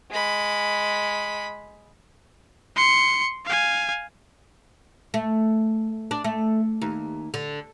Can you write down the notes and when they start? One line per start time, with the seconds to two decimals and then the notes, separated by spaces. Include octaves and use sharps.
0.11 G#3 B5
2.76 C6 C#7
3.45 F5 G#5
5.14 A3
6.11 D4
6.24 A3
6.82 D#2
7.34 D3